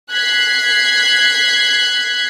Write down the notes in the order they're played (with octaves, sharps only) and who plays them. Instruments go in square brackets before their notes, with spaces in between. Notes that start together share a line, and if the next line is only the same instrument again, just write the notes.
[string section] F#6 G#6 B6 C7